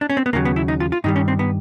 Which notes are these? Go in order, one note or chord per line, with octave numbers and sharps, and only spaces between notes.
D4
C#4
C4
B3
D#2 C#3 F#3 A#3
B3
E4
D#4
F4
F4
G2 D#3 G3 D#4
C#4
C4
B3